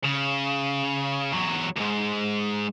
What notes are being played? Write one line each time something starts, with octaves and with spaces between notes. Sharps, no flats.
C#3
E2 F#3
C#2 G#2